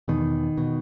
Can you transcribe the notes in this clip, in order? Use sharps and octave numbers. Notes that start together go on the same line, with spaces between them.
E2 B2 D#3
B2